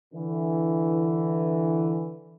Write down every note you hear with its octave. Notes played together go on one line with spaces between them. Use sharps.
D3 E3